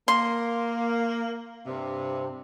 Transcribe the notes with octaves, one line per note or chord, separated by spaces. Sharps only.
A#3 C6
G2 C3